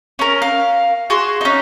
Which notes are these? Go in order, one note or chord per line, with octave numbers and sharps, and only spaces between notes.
C#4 A#4
F5
F#4 G#4 C6
C#4 D#4